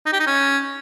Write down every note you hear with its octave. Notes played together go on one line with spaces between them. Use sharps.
D#4
G4
D#4
C#4